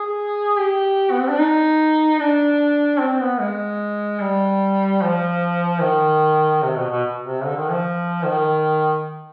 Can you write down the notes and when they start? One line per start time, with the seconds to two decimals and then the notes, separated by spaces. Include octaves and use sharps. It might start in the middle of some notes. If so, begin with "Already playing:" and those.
Already playing: G#4
0.59 G4
1.11 B3
1.20 C4
1.29 D4
1.39 D#4
2.19 D4
3.00 C4
3.21 B3
3.40 G#3
4.21 G3
5.02 F3
5.81 D#3
6.62 C3
6.76 B2
6.90 B2
7.23 C3
7.44 D3
7.57 D#3
7.70 F3
8.24 D#3